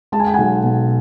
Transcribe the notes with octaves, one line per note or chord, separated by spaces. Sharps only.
G#3 A5
G#5
G5
B1 F#5 G#5
B2